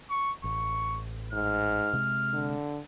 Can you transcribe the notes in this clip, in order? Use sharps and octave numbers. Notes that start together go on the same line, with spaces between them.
C#6
A1 C#6
G#2 F6
C3 G#3
D3